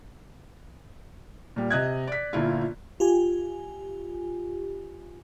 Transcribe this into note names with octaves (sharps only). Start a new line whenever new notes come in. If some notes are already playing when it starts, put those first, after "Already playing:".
A#2 G3
C3 D#5 F#6 G#6
D5 B6
G1 A#2 E4 F4
F4 G4 G#5